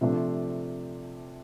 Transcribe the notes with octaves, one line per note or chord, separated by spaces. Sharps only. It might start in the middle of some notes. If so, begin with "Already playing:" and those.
C3 F3 A3 D4